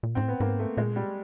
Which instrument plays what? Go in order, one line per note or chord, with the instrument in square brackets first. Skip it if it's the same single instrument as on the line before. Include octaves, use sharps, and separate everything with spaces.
[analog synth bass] A#2
[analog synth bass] G#2 [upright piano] C4
[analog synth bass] A2
[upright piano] B3
[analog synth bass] G#2 [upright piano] A#3
[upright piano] A3
[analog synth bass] A#2 [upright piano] G#3
[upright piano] G3